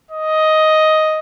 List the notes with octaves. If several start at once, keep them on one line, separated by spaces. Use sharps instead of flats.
D#5